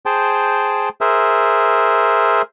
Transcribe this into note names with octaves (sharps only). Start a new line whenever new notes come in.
G#4 C5 G5 A5
G#4 A#4 C5 E5